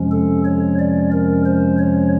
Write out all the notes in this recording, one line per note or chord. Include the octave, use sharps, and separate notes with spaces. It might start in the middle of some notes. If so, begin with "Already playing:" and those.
Already playing: F2 C3 F3 G#3 C#4
A4
C#5
D5
A#4
C5
C#5